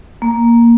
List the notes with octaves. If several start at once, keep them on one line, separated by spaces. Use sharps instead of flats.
A#3